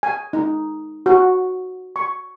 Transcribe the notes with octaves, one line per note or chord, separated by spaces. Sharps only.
G#5
D#4
F#4
C#6